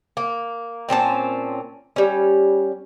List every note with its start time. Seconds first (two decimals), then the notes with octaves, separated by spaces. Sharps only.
0.17 A#3
0.89 A#2 C4 C#4 A5
1.96 G3 C#4